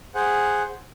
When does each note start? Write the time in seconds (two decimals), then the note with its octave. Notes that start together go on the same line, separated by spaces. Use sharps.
0.15 G#4 C5 F#5